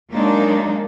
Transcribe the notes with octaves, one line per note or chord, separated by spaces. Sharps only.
F#3 G#3 A#3 D4 D#4